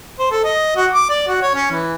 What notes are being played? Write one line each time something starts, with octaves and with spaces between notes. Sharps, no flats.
C5
A4
D#5
F#4
D6
D5
F#4
C#5
C#4
E3